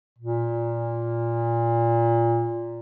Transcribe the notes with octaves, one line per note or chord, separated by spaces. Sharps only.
A#2